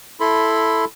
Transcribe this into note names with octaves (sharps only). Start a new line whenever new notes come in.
E4 A4 B5 C6